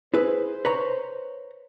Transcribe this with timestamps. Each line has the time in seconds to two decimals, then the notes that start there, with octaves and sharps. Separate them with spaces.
0.14 E4 G#4 B4 C5
0.65 B4 C#5 A#5